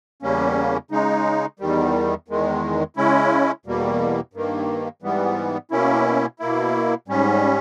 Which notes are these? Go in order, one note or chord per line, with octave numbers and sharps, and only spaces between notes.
E2 C#3 G3 A#3 C#4
C#3 G#3 D#4
E2 D#3 G3
E2 D#3 G#3
C#3 G#3 C#4 E4
E2 B2 G3 A#3
G2 D#3 A#3
G#2 E3 G3 B3
B2 A#3 C#4 E4
B2 A#3 E4
G#2 G3 C#4